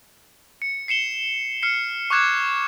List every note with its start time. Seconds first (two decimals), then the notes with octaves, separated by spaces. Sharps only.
0.62 C#7
0.88 C7 C#7 E7 G7
1.63 F6 C7 C#7
2.10 C#6 D6 F#6 G#6 E7